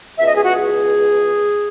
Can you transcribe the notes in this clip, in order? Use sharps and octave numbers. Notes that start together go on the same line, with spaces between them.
C#2 B2 E5
D#5
G#4
F#4
G#4